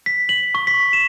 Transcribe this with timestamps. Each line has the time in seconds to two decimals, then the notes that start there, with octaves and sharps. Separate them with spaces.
0.06 B6
0.29 F#7
0.55 C#6
0.67 B6
0.93 E7